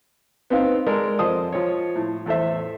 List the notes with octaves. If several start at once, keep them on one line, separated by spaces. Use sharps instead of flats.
B3 C4 D#4 F5
G#3 A4 A#4 D5
F2 C5 D#5 A5 D#6
F3 C#5
A2
E2 A2 A4 C5 E5